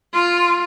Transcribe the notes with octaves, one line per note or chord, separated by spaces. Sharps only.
F4